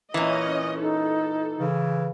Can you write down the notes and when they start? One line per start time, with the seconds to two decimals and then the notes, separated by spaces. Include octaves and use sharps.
0.14 A#2 E3 C#4 D#5
0.80 D#4 A4
1.60 C#3 E3